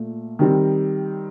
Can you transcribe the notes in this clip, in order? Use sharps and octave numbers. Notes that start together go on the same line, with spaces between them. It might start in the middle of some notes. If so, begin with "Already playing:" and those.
Already playing: A#2 A3
D#3 G3 C4